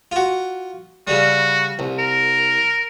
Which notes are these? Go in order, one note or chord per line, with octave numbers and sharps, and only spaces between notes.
F4 F#4
C#3 G3 F#4
C2
A#4